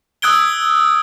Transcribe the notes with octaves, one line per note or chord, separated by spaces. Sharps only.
D#6 E6 F#6 G#6 D7 G7